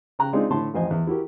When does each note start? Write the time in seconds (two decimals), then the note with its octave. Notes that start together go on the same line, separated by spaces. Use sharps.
0.19 C#3 G5 A#5 F#6
0.33 G#3 C4 D4 D#4 F4 G#4
0.50 A2 D3 E4 A5 C6
0.74 A1 F2 C5 D#5 G#5
0.91 E2
1.07 E4 F#4 G4 A#4